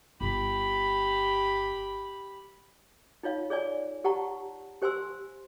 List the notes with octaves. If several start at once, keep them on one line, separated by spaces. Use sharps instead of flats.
G1 G4 B5
D#4 F4 C#5 F5
G#4 C#5 D5 G#5
G4 F#5 A5 A#5 C#6
G4 C5 G#5 C6 E6